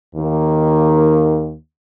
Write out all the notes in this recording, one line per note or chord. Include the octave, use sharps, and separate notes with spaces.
D#2 D#3 A#3